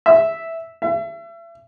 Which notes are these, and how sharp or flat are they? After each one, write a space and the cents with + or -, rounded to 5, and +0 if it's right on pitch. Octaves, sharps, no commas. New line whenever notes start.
E5 -5
E5 +35